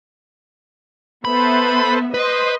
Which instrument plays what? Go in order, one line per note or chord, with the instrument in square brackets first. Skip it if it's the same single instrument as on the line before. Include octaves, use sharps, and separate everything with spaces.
[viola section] B3 E5 [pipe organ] A4 B4 C5 [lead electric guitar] B5
[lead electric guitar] B4 [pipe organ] C5 [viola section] D#5 C6